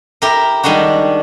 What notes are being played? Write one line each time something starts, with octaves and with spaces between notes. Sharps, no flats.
E4 G4 A#4
D#3 G3 G#3 D4 F#4